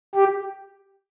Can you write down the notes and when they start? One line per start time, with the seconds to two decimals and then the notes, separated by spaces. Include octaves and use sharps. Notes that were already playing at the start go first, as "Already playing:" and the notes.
0.15 G4